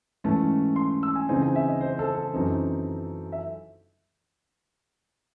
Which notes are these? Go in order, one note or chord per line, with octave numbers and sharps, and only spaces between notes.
G#2 E3 A3 C#4 A5
C6
E6
G#5
C#3 E3 C4 D#4 G#5
G#5
E5
D#5
C5
A4
A4
F#2 E3 C4 D#4
E5